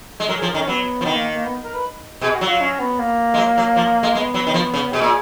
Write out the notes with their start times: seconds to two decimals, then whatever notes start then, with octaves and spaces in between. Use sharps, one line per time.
0.20 G#3
0.29 F#3 A#4
0.38 F3 G#4
0.48 A#4
0.54 D#3
0.58 C#4
0.67 F#3 B3
1.01 F3
1.05 D#3 B3
1.15 A#3
1.34 A#3
1.44 B3
1.64 A#4
1.73 B4
2.21 B2 G#4
2.35 F#4
2.41 F#3
2.47 F4
2.61 C#4
2.80 B3
2.99 A#3
3.34 G#3
3.37 F#3
3.58 F#3
3.76 F3
4.03 G#3
4.15 G#3 B3
4.34 F#3
4.47 D#3
4.54 F3
4.74 C#3
4.92 B2 G#4
5.01 A#2